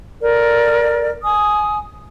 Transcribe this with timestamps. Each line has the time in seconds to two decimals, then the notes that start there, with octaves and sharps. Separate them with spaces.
0.21 A4 A#4 D5
1.23 G#5 D#6